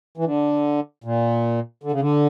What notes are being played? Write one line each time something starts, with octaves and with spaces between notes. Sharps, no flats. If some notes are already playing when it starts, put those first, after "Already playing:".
E3
D3
A#2
D3
C#3
D3